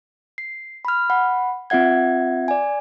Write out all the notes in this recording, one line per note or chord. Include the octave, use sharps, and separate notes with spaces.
C7
B5 F6
F#5 B5
C4 F4 E5 F#5 G#6
D5 G#5